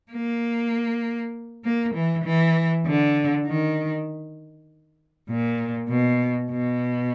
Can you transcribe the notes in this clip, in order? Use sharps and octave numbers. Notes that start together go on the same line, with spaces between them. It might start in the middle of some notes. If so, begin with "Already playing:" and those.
A#3
A#3
E3
E3
D3
D#3
A#2
B2
B2